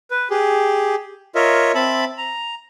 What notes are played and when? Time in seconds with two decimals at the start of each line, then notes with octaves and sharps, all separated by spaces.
0.11 B4
0.30 G4 G#4
1.35 F4 A#4 C#5 D#5 E5
1.75 C4 E5 A5 B5
2.18 A#5